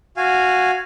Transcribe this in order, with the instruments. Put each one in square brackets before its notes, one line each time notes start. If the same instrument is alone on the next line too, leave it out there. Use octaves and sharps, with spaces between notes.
[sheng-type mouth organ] F#4 F5 G#5